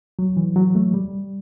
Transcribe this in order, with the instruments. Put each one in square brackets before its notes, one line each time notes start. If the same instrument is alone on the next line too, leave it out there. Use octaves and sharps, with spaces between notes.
[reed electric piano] F#3
E3
F#3
A3
G3